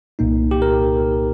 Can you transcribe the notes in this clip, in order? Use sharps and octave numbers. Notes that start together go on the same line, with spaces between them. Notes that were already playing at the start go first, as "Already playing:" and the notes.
C2 A#2 A#3 D#4
G4
A#4